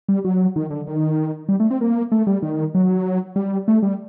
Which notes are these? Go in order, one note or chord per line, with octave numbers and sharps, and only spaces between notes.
G3
F#3
D#3
D3
D#3
G3
A3
C4
A#3
A3
G3
D#3
F#3
G3
A3
G3